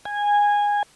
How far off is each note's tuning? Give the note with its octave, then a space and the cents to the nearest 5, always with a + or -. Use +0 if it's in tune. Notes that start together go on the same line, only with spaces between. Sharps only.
G#5 -15